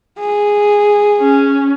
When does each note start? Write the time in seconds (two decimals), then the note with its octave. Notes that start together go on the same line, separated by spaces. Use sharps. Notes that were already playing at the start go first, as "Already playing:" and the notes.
0.19 G#4
1.20 C#4